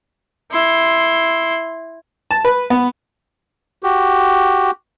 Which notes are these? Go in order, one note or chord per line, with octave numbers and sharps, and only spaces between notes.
E4 C6
A5
B4
B3
F#4 G4